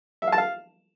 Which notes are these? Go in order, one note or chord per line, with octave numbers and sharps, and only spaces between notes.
E5
F5
A5
F5